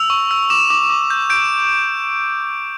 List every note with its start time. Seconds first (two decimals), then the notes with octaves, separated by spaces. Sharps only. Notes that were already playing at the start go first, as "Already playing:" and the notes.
Already playing: E6 F7
0.10 C#6
0.31 E6
0.50 D6 E7
0.70 D6
0.90 D6
1.10 G6
1.30 G6 D7